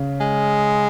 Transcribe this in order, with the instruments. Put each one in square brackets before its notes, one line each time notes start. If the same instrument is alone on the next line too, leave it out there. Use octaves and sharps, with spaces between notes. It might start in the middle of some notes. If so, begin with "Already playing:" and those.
Already playing: [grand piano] C#3
[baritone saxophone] G#3